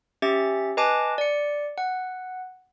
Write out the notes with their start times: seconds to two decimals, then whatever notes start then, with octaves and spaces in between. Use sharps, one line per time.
0.22 C#4 G4 E5 A6
0.77 B4 D#5 G#5 A5 D6
1.18 D5 C#7
1.78 F#5